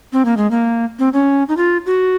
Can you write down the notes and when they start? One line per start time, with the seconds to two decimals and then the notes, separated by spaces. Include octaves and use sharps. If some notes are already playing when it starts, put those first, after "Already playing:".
0.13 C4
0.25 A#3
0.37 G#3
0.51 A#3
0.99 C4
1.13 C#4
1.48 D#4
1.57 F4
1.86 F#4